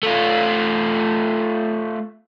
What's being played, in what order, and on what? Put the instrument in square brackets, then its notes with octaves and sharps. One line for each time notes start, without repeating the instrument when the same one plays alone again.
[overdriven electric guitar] A3 F4